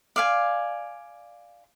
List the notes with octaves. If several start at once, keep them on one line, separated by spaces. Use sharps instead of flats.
D5 F5 G#5